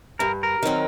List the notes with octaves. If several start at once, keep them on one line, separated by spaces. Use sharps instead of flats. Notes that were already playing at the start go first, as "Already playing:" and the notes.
G2 A#4
A#4
D#3 F#3 C4